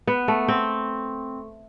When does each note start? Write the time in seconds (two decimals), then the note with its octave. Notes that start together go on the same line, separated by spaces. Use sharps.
0.07 B3
0.28 A3
0.48 C4